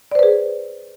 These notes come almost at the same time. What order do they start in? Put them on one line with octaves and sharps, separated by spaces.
D5 C5 B4 G#4